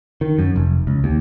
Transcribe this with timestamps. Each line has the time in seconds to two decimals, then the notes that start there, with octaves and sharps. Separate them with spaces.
0.21 D#3
0.39 F#2
0.56 F1
0.87 C#2
1.04 D#2